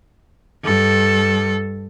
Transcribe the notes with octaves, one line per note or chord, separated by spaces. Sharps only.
G2 A4